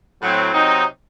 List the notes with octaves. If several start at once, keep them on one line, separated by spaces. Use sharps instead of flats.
A2 F#3 C4
C3 F#3 C4 D#4